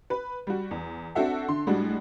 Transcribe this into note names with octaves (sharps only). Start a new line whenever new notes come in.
B4
G3 F#4
E2
C4 D4 F#4 A4 E5 F#5
D3 C6
A2 G3 G#3 D4 F#4